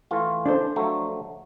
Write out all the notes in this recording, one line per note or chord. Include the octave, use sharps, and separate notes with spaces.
E3 A3 F4
D4 A4 C5
F3 F#3 A3